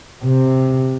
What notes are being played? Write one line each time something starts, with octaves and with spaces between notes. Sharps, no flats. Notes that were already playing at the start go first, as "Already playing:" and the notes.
C3